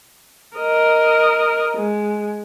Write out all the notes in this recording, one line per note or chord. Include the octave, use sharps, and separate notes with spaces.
A#4 D#5
G#3